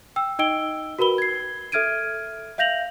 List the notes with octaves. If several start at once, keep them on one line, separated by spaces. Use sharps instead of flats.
G5 E6
D#4 D#5 G5 E6 D7 G7
F#4 A#4 B4 B5 G7
G#6 C7
A4 E5 F6 G#6 D7 D#7
E5 F5 G6 A#6 F7 F#7